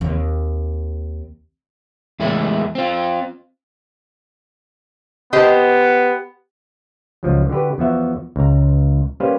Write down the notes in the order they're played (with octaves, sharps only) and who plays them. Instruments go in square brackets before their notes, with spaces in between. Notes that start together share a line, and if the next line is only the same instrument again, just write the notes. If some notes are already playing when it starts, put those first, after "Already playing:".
[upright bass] D#2 C4
[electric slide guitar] E2 G#3 A3 E4
C4 F4
[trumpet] B3 [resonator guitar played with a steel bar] G4 C5 D#5
[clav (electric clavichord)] C#2 F3 F#3
D3 F#4 G4 B4
E2 F3 B3 F#4 E5 F#5
C#2 A#5
G3 A#3 C#4 B4 C5 F5